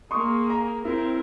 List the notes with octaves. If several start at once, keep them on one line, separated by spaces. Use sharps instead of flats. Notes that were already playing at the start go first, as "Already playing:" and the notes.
A#3 G#4 C6 C#6 D#6
A#5
C4 E4 A#4